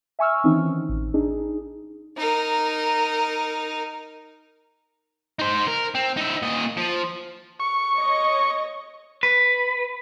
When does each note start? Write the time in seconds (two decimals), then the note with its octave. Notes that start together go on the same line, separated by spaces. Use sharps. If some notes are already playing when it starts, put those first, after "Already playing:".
0.19 E5 G#5 C#6 E6 F6
0.44 D#3 E3 C4 C#4 D#4
0.89 A1
1.14 D4 D#4 G#4
2.17 D#4 A#4
5.39 D#4 C5
5.67 A#4
5.95 C4
6.17 D#4 E5
6.43 A#2 D#5
6.77 F3
7.60 C#6
7.97 C#5 D#5
9.23 B4